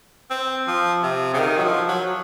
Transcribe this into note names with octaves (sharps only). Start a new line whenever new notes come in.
C4
F3
C3
C#3
D#3
F#3
F3
F#3